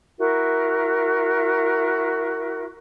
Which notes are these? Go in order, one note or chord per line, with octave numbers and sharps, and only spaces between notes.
E4 F#4 A#4